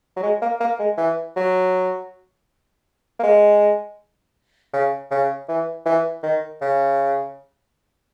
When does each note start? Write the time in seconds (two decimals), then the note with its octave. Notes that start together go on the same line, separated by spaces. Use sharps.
0.16 F#3
0.23 G#3
0.42 A#3
0.60 A#3
0.79 G#3
0.98 E3
1.36 F#3
3.19 A#3
3.23 G#3
4.73 C#3
5.11 C#3
5.48 E3
5.86 E3
6.23 D#3
6.61 C#3